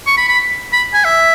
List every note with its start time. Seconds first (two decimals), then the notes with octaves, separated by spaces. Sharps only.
0.07 C#6
0.17 B5
0.29 B5
0.72 B5
0.94 G#5
1.05 E5